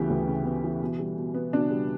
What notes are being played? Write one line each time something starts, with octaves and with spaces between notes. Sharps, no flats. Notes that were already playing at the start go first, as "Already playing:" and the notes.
Already playing: D2 C#3 E3 B3 G4
D2
C#3
B3
E3
B2
G3
B2
B3
B2 D4
G3